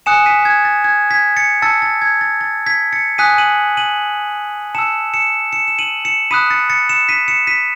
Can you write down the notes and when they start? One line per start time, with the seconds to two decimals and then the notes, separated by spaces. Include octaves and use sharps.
0.06 G#5 D#6 F#6 C#7 E7
0.26 B6 D#7
0.45 G#6
0.65 A6
0.84 G#6
1.11 G#6 B6
1.36 A6 C#7
1.62 A5 E6 A6 C#7
1.82 A6
2.02 G#6
2.21 A6
2.41 A6
2.66 G#6 B6
2.93 A6 C#7
3.18 G#5 D#6 F#6 B6 D#7
3.38 D#7 F#7
3.77 D#7 F#7
4.75 A5 E6 C#7 E7
5.14 C#7 E7
5.53 C#7 E7
5.68 E7
5.79 D#7 F#7
6.05 C#7 E7
6.31 B5 D#6 F#6 B6 D#7
6.50 A6 C#7
6.70 A6 C#7
6.89 C#7 E7
7.09 B6 D#7
7.28 C#7 E7
7.47 B6 D#7